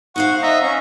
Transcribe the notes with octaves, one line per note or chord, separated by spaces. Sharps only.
D#4 C5 F5 F#5 C#6
D#5 E5 A#5
C#4 C#6